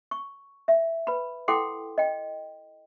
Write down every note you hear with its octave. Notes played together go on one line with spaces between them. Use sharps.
C#6
E5
B4 B5
E4 A4 F#5 G5 C6 D6
D#5 G5